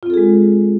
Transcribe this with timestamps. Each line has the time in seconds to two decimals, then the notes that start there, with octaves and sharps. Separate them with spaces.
0.03 F4
0.06 C4
0.10 A4
0.14 G#4
0.17 G#3